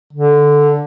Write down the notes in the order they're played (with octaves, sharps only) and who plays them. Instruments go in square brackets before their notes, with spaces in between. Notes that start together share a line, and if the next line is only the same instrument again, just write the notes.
[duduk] D3